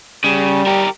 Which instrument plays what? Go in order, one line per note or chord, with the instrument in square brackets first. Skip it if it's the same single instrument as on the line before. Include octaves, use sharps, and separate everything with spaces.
[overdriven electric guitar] C#3 [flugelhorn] G3
[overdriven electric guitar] G4 A#4